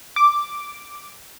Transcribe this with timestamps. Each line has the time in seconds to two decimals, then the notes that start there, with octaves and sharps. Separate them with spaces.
0.16 D6